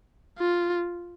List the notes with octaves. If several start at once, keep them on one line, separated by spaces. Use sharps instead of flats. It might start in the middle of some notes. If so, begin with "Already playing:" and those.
F4